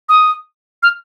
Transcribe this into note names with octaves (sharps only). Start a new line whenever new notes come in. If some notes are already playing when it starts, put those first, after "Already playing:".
D#6
F6